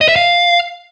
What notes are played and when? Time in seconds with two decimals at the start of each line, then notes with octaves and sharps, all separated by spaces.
0.01 D#5
0.08 E5
0.16 F5